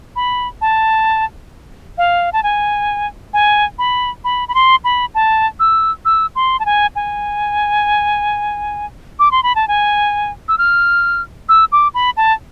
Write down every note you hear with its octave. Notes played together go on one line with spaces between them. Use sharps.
B5
A5
F5
A5
G#5
G#5
B5
B5
B5
C6
B5
A5
E6
E6
C6
A5
G#5
G#5
D6
C6
B5
A5
G#5
E6
F6
E6
D6
B5
A5